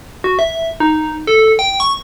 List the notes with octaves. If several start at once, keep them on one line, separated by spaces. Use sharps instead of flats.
F#4
E5
D#4
A4
G5
C#6